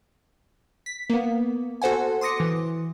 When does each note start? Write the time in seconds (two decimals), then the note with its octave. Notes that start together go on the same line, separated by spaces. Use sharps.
0.86 B6
1.10 A#3 B3
1.82 F#4 A4 C5 F#5 G#5
2.21 C6 D6 D#6 A#6 C#7
2.40 E3